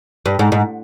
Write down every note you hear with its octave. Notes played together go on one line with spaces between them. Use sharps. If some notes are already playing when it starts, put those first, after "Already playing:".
G2
G#2
G#2